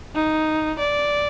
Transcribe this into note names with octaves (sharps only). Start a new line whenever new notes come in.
D#4
D5